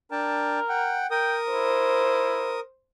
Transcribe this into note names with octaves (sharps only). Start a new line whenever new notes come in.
D4 A#4 G5 A5
F#5 G5
A#4 G5 D#6
E4 C5